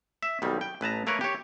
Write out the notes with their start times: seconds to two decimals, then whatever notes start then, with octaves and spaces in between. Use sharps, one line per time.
0.23 E5
0.42 B1 D#3 G3
0.61 G5
0.81 A1 B4 A5 A#5
1.06 A3 A#3 A#4 B4 C#5
1.21 G4 C#5